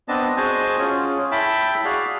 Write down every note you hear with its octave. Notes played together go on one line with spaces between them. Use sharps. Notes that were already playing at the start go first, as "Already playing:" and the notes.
B3 C4 D4 D#5 A5
F#4 G#4 C5 D#5 G#5 A5
C#4 F4 G#4
E4 E5 G5 A5 B5
F#4 G#4 D5 F5